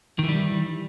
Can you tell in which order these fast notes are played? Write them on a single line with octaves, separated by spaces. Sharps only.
D#3 E3 G3